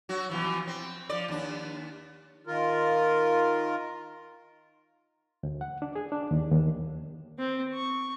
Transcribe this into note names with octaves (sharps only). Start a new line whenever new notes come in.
F#3 F#4
B2 E3 F3
C4
F3 D5
D#2 D4
D#3 F4 A#4
D2
F#5
D4
G#4
D4
D#2
D#2
C4
C#6